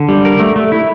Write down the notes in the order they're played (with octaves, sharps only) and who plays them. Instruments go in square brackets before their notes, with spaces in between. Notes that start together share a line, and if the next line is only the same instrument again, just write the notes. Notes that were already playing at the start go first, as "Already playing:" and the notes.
Already playing: [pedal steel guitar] D3
G3
A#4
A3
A3
E4